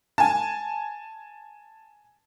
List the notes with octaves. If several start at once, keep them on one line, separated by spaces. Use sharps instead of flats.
G#5 A5